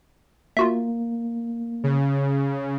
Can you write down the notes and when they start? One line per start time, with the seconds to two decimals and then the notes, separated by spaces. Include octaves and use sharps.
0.57 A#3 F4 F#4 E5
1.84 C#3